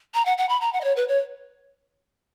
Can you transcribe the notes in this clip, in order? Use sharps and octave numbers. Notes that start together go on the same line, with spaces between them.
A#5
F#5
F#5
B5
A#5
F#5
D#5
C#5
B4
C#5